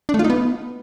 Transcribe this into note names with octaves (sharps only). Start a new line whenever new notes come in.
D4
A3
F4
D#4
B3